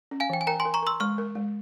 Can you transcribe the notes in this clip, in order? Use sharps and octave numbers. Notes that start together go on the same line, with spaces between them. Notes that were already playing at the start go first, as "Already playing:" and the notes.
C#4
F5 G#5
E3 G5
G#5
A#4 G5 A#5
G#5 C6
A#4
A#5 C#6
A#4 C6 E6
G#3 C#6 F6
A#4
G#3